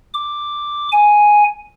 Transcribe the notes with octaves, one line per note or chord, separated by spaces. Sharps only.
D6
G#5